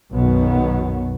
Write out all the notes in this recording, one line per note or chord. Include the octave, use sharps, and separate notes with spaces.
B1 F#2 B2 D#3 F#3 B3